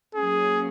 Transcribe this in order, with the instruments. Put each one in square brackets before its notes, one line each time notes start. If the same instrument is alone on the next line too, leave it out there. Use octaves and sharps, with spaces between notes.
[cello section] F#3 A#3 C#4 [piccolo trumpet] G#4